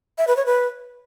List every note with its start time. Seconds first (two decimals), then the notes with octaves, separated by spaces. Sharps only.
0.18 E5
0.27 B4
0.37 C#5
0.46 B4